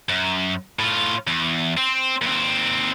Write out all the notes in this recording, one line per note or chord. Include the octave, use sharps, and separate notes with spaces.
F#2
A2 F4
E2
C4
D#2 C4